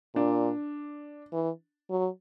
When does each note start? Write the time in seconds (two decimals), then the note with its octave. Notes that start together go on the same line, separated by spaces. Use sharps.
0.15 A#2 D4
1.33 E3
1.90 F#3